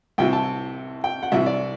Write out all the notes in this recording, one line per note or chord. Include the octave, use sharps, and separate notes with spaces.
C2 C3 E3 G5
A5
G5
F#5
C2 C3 E3 E5
D5